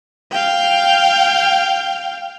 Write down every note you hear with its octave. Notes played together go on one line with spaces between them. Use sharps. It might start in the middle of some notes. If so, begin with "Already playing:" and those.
F5 G5